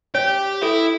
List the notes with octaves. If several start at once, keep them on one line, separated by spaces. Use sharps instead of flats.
G4 C#5
E4 A4